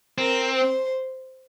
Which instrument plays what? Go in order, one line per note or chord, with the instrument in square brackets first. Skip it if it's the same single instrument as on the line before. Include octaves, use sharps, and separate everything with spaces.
[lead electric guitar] C4 [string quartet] A#4
[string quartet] C5